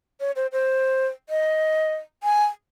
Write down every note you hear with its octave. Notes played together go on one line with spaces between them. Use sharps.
C#5
C5
C5
D#5
G#5